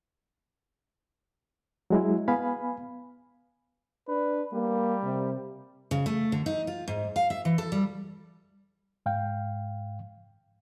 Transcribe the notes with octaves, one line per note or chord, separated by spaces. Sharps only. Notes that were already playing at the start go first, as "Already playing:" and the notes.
F#3 G#3 E4
B3 F5 G#5 B5
D4 B4
G3 A#3
C3
C#3
A3
D3
D#4
F4
G#2
F5
E5
E3
A4
G3
G#2 F5 G5